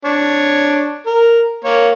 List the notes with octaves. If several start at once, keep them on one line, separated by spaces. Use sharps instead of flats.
D4 C#5
A#4
A#3 C#5